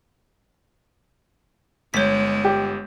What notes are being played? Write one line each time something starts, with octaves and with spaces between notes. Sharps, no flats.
G1 G#3 C#5 G6 B6
G4